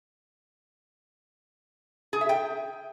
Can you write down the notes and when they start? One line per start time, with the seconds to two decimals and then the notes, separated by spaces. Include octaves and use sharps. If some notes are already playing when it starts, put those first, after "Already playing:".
2.13 G#4
2.21 E5
2.29 G5